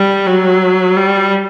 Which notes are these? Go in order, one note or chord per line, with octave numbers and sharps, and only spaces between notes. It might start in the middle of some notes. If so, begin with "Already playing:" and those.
Already playing: G3
F#3
G3